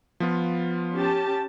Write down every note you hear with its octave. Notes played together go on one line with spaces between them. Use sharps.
F3 B3 F4
C#4 G4 A5